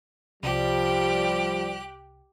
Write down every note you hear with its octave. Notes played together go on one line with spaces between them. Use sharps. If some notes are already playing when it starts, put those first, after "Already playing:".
C2 F3 G3 G4 F#6